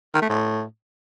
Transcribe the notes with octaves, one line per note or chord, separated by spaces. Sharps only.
D#3
A3
A2